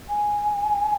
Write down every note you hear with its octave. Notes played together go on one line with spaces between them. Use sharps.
G#5